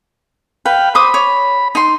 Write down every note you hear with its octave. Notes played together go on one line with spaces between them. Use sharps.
B4 F5 G5
C5 B5 D6 D#6
C#5
D#4 C6